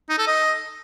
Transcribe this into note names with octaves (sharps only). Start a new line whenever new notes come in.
D#4
A4
D#5